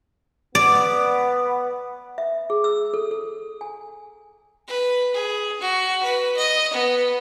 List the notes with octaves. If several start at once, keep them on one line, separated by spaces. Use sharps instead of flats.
B3 D5
E5
G#4
E6
A4
A4
G#5
B4
G#4
F#4
B4
D#5
B3